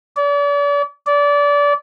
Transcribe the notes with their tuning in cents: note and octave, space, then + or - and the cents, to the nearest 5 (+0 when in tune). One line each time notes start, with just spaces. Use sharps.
D5 -40
D5 -25